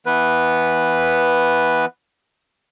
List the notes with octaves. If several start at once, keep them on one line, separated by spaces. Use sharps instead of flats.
E3 B3 B4